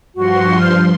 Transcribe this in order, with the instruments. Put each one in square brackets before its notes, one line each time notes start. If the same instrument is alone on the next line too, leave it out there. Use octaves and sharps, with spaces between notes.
[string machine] G2 F3 C6 [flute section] F#4
[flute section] C5 F6